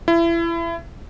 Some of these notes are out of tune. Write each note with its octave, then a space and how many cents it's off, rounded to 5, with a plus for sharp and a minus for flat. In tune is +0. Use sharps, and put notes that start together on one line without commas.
E4 +30